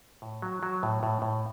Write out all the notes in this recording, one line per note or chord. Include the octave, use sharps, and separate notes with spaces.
A2
F#3
F#3
A2
A2
A2